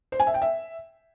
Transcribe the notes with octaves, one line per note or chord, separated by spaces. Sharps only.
C5
G#5
E5
G5
E5